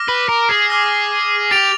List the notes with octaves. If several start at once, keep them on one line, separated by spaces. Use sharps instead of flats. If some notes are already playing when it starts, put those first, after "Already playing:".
Already playing: D6 F6 A#6
B4
A#4
G#4
D6 F6 A#6
G4 A6 D7 F7